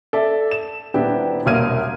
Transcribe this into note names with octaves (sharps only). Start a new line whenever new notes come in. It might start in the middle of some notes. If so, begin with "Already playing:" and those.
A4 D5 E5
E7
D#1 B3 D4 E4 G4
E1 C2 A#3 F6 G#6 D#7